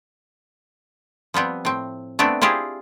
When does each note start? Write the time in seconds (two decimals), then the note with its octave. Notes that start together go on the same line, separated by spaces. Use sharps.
1.34 F3 G3 B3 C4
1.65 A2 C4
2.19 A3 B3 C4 D4
2.41 C4 E4 F4 G4 G#4 C5